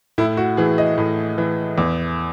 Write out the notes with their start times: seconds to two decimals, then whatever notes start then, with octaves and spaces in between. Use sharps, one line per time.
0.18 A2 E4
0.37 F#4
0.57 E3 G#4
0.78 D#5
0.98 A2
1.38 E3
1.78 E2